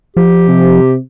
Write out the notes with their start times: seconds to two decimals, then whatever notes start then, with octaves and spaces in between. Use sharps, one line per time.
0.17 F3 G4
0.48 C3